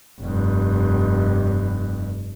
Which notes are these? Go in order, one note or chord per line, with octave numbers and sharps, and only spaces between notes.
F1 G2